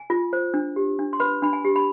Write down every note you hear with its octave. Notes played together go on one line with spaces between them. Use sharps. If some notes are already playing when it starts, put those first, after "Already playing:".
Already playing: G#5
F4
C5
D4
G4
D4
C6
B4 B5
D4 B5
G#5
G4
B5